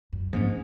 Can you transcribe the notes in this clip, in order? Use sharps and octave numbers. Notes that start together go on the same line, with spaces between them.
F#2
G#2 F3 A#3 C#4